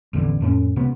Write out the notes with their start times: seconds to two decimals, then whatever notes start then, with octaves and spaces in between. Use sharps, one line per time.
0.13 A1 E2 D3 E3
0.41 F2 A2 A3 C#4
0.76 C#2 C3 B3